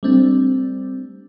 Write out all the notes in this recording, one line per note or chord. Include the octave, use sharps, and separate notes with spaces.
G3 A3 C4 D4